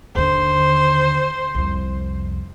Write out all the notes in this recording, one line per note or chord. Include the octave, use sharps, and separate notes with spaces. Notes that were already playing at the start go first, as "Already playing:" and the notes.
D#2 D3 C5
C2 F2